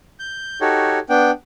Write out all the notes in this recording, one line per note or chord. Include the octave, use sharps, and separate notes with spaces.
G6
D#4 F#4 G4 A4 C#5
B3 D4 G5